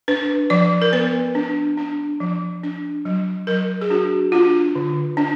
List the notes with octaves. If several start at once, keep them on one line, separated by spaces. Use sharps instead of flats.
D4 B4
F3 D5
A#4
B3 B4
D4
D4
F3
D4
F#3
F#3 A#4
G#4
D4 F#4
D4 F4
D3
D4